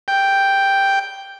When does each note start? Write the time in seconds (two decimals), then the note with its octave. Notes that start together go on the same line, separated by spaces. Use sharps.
0.08 G5